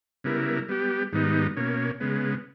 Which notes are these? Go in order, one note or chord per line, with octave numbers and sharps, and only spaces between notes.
C#3 G3 B3 E4 A#4
G3 B3 G4
G#2 D#3 G3 B3 D#4
B2 A#3 C#4
C#3 G#3 B3